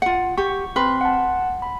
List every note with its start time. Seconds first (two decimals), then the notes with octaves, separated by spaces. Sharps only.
0.02 F4 F#5
0.38 G4 C#6
0.76 C4 B4 C6
1.01 F#5 A5
1.62 B5